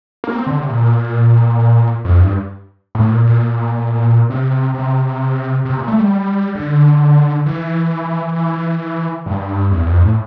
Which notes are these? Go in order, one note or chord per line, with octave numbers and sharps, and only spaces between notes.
A#3
C4
D3
C3
A#2
F2
G2
A2
A#2
A#2
C3
C3
C3
A#2
A3
G3
D3
E3
G2
E2
F2
A2